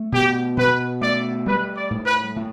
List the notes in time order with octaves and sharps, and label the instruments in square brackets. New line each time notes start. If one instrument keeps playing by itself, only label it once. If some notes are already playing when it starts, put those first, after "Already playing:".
Already playing: [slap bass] A3
[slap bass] B2 [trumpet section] G4
[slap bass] B2 [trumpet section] B4
[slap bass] A3 [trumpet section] D5
[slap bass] G3 [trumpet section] B4
[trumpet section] D5
[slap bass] A2
[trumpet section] B4
[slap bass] A2